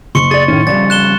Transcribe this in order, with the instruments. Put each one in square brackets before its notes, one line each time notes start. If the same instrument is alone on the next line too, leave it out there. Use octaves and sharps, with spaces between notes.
[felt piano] F#1 [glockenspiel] C6 C#6 C#7
[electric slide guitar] G#4 D5 [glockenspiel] A6
[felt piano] A2 D#3 [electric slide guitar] C#4
[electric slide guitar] F2 C#3 G3 [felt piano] D5 [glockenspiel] A6
[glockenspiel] F#6 E7 G7